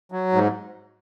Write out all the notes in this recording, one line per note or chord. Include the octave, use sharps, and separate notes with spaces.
F#3
G#2